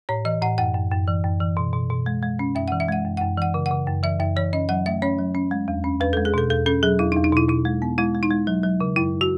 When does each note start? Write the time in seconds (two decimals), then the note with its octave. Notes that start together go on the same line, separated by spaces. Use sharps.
0.09 A2 C#5
0.25 E3 D#5
0.42 A2 F#5
0.58 F#2 F#5
0.74 F#2
0.91 F#2
1.07 E3
1.24 F#2
1.40 E3
1.57 B2
1.73 B2
1.90 B2
2.06 G#3
2.23 G#3
2.39 C#4
2.55 F#2 E5
2.68 F#5
2.72 E3
2.80 E5
2.88 G#3 F#5
3.05 F#2
3.17 F#2 F#5
3.38 E3 F#5
3.54 C#3
3.66 C#3 F#5
3.87 F#2
4.03 E3 E5
4.20 F#2 E5
4.36 E3 C#5
4.53 C#4 D#5
4.69 F#3 F#5
4.86 A3 E5
5.02 C#4 C#5
5.19 F#3
5.35 C#4
5.51 G#3
5.68 E2
5.84 C#4
6.01 E2 B4
6.13 A4
6.17 G#3
6.25 G#4
6.34 B2 A4
6.50 E2 A4
6.66 C#4 A4
6.83 F#3 G#4
6.99 E2 E4
7.12 D#4
7.16 E2
7.24 D#4
7.33 B2 E4
7.48 B2 E4
7.65 G#3
7.82 B3
7.98 G#3 E4
8.15 G#3
8.23 D#4
8.31 G#3
8.47 F#3
8.63 F#3
8.81 C#3
8.96 F#2 E4
9.21 F#4